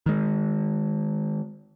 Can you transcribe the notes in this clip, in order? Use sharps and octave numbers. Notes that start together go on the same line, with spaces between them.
D#3 G#3